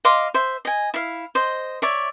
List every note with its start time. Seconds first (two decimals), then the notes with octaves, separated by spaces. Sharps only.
0.05 D#5 F5 C6 D6
0.34 C5 E5
0.65 D#5 G#5
0.94 E4 F5
1.35 C5 D#5
1.82 C#5 D5 E5